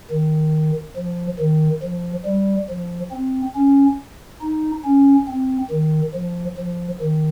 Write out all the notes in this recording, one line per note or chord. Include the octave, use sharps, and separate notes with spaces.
D#3
F3
D#3
F3
G3
F3
C4
C#4
D#4
C#4
C4
D#3
F3
F3
D#3